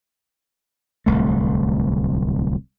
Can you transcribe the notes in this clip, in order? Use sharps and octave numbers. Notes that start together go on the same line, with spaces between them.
D1 C2 A3